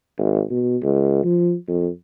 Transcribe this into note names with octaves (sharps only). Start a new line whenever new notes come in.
G#1
B2
C#2
F3
F2